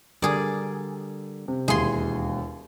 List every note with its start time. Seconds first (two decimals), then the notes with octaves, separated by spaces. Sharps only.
0.22 D3 G3 G#4 A#4 D5
1.48 C3
1.68 E1 D#2 E4 G#4 C6